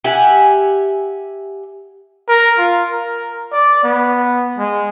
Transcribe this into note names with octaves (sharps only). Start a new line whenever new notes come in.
G4 E5 F#5 G#5
A#4
F4
A#4
D5
B3
G#3